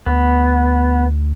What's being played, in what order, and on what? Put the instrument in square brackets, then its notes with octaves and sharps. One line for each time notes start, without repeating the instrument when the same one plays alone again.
[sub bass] D2 [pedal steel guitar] B3